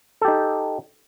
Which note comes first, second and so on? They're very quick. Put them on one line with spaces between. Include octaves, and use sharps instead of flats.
A4 G4 D#4